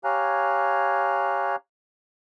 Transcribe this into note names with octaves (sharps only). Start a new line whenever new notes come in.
G4 C#5 F5 G#5 A#5 F#6